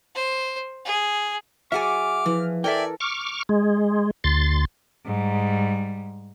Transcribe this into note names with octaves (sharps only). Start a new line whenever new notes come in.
C5
G#4
F#3 G#4 D5 E5 F#5 G#5 D6 F6
E3 F3
A4 A#4 D5 E5 G5 G#5
C#6 D6 F6
G#3
D2 C6 A6
G#2 G3